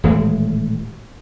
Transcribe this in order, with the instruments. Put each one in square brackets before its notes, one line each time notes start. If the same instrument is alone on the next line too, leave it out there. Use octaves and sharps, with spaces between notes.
[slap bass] D#1 A2 E3 G#3